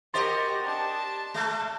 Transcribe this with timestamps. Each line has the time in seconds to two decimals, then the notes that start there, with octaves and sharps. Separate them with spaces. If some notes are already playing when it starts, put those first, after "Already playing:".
0.14 F#4 G4 A#4 C5 D#5 C6 A6
0.64 D4 A5
1.34 G#3 A3